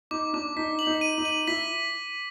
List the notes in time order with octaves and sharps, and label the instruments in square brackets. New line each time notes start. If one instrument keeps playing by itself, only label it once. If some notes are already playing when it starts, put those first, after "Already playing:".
[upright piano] D#4 [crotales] D6
[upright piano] D4 [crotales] D6
[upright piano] D#4 [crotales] B6
[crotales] F#7
[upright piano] D#4
[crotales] D#7
[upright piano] D#4
[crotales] F#7
[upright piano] E4 [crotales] B6